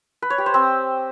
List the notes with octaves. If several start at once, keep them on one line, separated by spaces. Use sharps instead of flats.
B4
C#5
G4
C5
C4